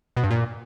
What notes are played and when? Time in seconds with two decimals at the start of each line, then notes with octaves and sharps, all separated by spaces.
0.17 B2
0.24 G2
0.31 A#2